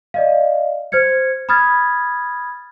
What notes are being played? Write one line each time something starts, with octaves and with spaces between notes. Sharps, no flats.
D5 D#5 F5
C5 F6 G#6 C#7
B5 D#6 F6 G#6 A6